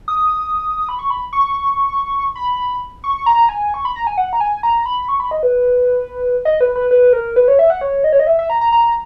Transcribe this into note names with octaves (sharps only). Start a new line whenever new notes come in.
D#6
B5
C#6
B5
C#6
B5
C#6
A#5
G#5
C#6
B5
A#5
G#5
F#5
A#5
G#5
A#5
B5
C#6
B5
D#5
B4
D#5
B4
B4
B4
A#4
B4
C#5
E5
F#5
C#5
D#5
C#5
D#5
E5
E5
A#5
A#5
A#5